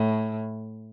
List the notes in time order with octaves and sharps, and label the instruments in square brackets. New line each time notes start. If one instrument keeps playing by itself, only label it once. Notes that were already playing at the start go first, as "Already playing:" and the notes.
Already playing: [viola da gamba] A2